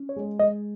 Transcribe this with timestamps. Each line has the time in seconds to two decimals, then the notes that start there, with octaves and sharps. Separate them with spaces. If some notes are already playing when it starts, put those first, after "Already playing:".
Already playing: C#4
0.09 C#5
0.16 G#3
0.39 G#3 D#5